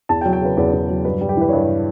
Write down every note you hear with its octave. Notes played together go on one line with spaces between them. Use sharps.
E2 A5
G5
F#3
G5
C#3 B4
E2 B4
E2
F#3
G2 B4
G3
G4
E3 B4
C#5
G2 B4